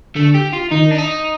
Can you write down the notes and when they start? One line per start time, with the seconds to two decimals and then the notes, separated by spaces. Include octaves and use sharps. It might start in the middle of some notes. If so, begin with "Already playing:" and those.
0.15 D3 A3
0.34 G4
0.53 F4
0.71 D#3 D#4
0.91 D4
0.98 D#4